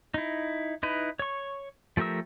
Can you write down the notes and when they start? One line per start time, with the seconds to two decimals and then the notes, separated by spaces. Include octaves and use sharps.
0.14 D#4 E4
0.83 D#4 E4 B4
1.19 C#5 C#6
1.97 F3 A3 G4 A#4 E6